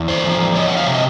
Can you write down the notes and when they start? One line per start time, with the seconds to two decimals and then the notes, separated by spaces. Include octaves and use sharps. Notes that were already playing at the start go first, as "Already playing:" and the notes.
Already playing: E2
0.08 C5 D5
0.25 F3
0.55 E2 C#5 D#5
0.68 F#5
0.77 F5
0.85 C3 E5
0.95 D#5